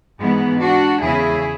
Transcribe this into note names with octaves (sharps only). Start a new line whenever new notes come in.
G#2 E3 G#3 B3
D4 F#4
E2 C#3 E3 E4 G#4